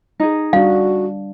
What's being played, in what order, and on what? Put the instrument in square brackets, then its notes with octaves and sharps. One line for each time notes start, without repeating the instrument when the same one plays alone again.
[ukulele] D#4 G#4
[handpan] G3 D4 [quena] F#4 [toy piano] F5